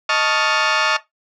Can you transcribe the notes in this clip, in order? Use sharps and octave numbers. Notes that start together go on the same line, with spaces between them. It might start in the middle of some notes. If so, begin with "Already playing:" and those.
D#5 A5 C#6 F6